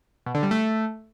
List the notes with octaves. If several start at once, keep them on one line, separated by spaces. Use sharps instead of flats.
B2
D3
G3
A3